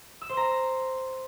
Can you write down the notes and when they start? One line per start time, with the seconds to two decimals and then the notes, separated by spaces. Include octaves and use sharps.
0.21 E6
0.29 C5
0.37 A#5